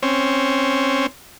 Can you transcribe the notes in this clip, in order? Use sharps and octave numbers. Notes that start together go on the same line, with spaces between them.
C4 C#4